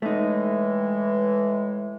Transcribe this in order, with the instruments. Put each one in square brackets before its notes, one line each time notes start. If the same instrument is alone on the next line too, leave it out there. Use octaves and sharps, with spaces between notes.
[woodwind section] A2 E3 G#3 [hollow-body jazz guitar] A3 D#4